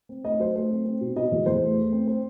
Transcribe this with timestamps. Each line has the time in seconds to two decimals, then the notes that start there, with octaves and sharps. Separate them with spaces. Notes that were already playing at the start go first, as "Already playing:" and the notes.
0.09 C4
0.25 A3 D#5
0.39 F#3 C5
0.55 A3 C5
0.70 C4
0.85 C4
1.01 B2
1.16 B2 D#5
1.32 E2
1.46 E2 C5
1.61 A3
1.77 A3
1.92 C4
2.07 C4